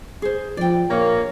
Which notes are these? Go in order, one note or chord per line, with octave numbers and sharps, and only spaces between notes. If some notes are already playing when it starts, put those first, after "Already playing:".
G#4 C5
F3 D5 G5
A#1 A#3 C#5